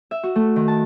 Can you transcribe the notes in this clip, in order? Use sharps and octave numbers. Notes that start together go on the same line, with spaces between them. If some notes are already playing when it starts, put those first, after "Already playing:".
E5
F#4
A3
D#3
A5